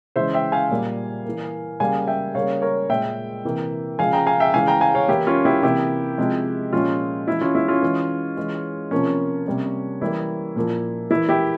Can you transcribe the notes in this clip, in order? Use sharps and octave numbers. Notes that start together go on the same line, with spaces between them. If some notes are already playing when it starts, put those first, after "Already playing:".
C#3 E3 G#3 C5 E5
E5 G5
F5 G#5
A#2 G3 A#3
E3 A#3
C#3 G3 A#3 F5 G#5
E5 G5
C#3 G3 A#3 C#5 F5
A#4 C#5
A#2 G#3 E5 G5
C3 E3 A#3
C#3 F3 G#3 F5 G#5
G5 A#5
F5 G#5
E5 G5
C#3 E3 G#3 F5 G#5
G5 A#5
F5 G#5
C#5 F5
E3 A#3 E4 G4
C#4 F4
E4 G4
C3 E3 A#3 E4 G4
C3 F3 G#3
A#2 F3 G#3 C#4 F4
E3 G#3 E4
C#4 F4
E4
C#4 F4
E3 G#3
E3 G#3
C3 F3 A#3 C#4
C3 G3 A#3
E3 G3 A#3 E4
A#2 F3 A#3
E3 A#3 E4
E4 G4